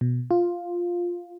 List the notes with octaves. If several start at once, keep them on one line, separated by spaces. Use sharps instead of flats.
B2
F4